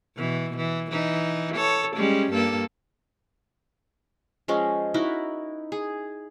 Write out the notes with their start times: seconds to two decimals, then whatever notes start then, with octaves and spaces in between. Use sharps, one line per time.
0.16 B2 E3
0.57 E3
0.91 E3 D#4
1.55 A4 C#5
1.96 G3 G#3 C#4
2.32 G2 A#3 A4
4.48 F3 G#3 C#4
4.94 D#4 E4 F#4 A#4
5.72 G#4